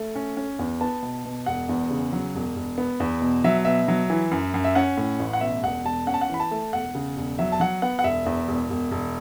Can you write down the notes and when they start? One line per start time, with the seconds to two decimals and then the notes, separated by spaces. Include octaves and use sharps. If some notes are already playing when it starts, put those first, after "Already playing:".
Already playing: A3
0.15 C#4
0.37 C#4
0.59 E2
0.81 B3 A5
1.03 B2
1.25 B2
1.46 E1 F#5
1.69 E2
1.91 C#3
2.13 F#3
2.35 E1
2.57 E1
2.78 B3
3.00 E2
3.22 B2
3.44 F#3 E5
3.65 B2 E5
3.88 F#3
4.10 E3
4.31 F#2
4.54 F#2
4.64 E5
4.75 C#4 F#5
4.97 A2
5.19 A1
5.33 F#5
5.41 B2 E5
5.63 E1 F#5
5.85 E1 A5
6.07 C#4 F#5
6.14 A5
6.21 F#5
6.29 E3 B5
6.40 A5
6.51 A3
6.73 E1 F#5
6.95 C#3
7.17 E1
7.38 F#3 E5
7.52 A5
7.60 F#3 F#5
7.82 B3 F#5
7.99 F#5
8.04 E1 E5
8.26 E2
8.48 E1
8.70 E1
8.91 E1